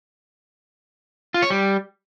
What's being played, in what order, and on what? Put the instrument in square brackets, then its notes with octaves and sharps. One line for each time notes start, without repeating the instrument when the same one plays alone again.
[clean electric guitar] F4
C#5
G3